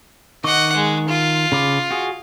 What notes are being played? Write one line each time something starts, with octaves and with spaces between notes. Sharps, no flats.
D#3 D#5 F#5 C#6 D6
G#3
F4
C#3 B5 D6
F#4 G#4